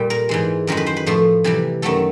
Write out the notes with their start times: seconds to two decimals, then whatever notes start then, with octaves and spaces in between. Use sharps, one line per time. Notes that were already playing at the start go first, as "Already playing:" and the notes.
Already playing: A#2 G3
0.10 A#4
0.29 G#2 E3 G#3
0.67 F#2 D#3 G#3 A#4
0.77 B4
0.87 C5
0.97 B4
1.06 A2 F3 A3
1.44 C3 E3 G3
1.82 F#2 D#3 F#3 A3 A4